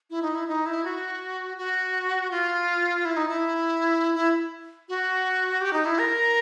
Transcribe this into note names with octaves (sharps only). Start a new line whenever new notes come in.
E4
D#4
E4
D#4
E4
F#4
F#4
F4
E4
D#4
E4
E4
F#4
G4
D#4
E4
A#4